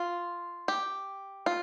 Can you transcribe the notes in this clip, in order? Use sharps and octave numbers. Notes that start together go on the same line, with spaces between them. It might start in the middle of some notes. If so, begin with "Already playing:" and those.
Already playing: F4
G4
F4